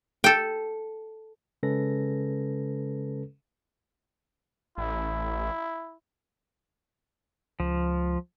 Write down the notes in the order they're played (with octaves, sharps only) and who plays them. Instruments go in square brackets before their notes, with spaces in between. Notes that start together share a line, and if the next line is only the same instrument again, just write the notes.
[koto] A4 G5
[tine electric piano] C#3 G#3 C#4 A4 B4 A#6
[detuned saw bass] A1 [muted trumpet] E4
[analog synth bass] C#2 [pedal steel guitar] F3